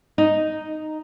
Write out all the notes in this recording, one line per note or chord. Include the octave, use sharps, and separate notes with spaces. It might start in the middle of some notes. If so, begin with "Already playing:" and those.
D#4